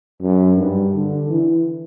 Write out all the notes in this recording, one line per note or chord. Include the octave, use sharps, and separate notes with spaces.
F#2
G2
D3
E3